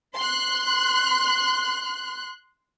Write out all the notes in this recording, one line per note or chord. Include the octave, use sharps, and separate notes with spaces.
C6 F#6